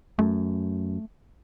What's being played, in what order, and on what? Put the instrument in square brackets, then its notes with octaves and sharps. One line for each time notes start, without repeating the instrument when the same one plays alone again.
[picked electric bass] F#2 [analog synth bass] A3